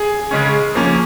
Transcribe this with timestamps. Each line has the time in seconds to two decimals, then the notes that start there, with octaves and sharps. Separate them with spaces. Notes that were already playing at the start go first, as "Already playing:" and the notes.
Already playing: G#4
0.31 C#3 G#3 C#4
0.75 F3 A#3 C#4